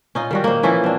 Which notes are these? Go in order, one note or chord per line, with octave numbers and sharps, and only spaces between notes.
C#4 D#4 F4
D#3 G3 F#4
A#3 C5
E3 F3 C#4 E4
C4 D4